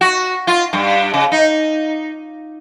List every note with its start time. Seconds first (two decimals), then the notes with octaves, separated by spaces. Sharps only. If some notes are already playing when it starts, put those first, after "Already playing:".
0.01 F#4
0.47 F4
0.73 G2
1.14 C#3
1.32 D#4